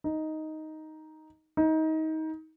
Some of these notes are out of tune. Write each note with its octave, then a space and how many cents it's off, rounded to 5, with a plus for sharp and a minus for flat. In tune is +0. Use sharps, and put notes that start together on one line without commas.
D#4 +5
D#4 +25